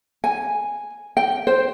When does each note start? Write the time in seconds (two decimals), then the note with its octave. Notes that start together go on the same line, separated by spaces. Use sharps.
0.24 G#5
1.17 G5
1.47 C5